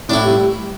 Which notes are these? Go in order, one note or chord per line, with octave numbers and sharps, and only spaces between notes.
A2 D4 E4
G3